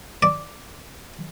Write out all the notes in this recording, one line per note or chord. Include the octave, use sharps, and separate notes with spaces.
D5